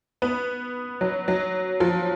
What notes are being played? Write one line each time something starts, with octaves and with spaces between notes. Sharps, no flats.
B3
F#3
F#3
F3